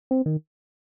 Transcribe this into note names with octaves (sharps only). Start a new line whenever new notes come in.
C4
D#3